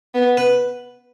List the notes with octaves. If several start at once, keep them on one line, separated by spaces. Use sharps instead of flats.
B3
B4